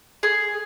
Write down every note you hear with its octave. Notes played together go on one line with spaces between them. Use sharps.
G#4